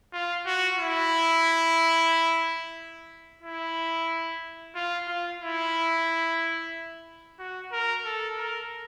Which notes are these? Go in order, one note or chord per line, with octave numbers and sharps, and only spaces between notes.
F4
F#4
E4
E4
F4
F4
E4
F#4
A#4
A4
A#4